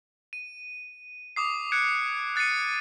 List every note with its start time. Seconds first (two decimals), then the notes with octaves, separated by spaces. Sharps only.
0.33 D#7
1.36 D6 D#6 C7
1.72 F#6 G#6 C#7 D7
2.36 F#6 A6 C7 C#7 D#7